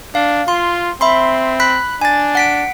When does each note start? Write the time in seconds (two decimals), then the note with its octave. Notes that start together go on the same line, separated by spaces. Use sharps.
0.15 D4 F5
0.48 F4 C6
1.01 C4 E5 B5 C6
1.60 B5 F#6 B6
2.01 D4 G#5 A6
2.35 F#5 B6 D7